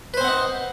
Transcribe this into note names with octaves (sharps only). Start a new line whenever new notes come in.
C4 D#4 B4 C5 F#5